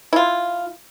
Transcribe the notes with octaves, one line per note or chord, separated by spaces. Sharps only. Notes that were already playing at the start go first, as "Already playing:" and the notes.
E4 F4